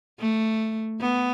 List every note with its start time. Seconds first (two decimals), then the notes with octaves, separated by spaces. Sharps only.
0.20 A3
1.01 B3